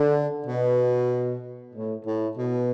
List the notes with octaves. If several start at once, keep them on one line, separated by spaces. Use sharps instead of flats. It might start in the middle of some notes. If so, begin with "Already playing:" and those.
Already playing: D3
B2
A2
A2
B2